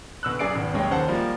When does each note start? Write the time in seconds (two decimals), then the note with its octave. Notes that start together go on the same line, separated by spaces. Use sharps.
0.23 D2 B2 E6 F#6
0.39 F#2 G#4 D5 C7 D7
0.55 G#1 B2
0.73 D#1 F#2 G#3 C#5 G5
0.91 D#2 C#3 C5 F#5 A5
1.08 F3 G3 G#3 A#3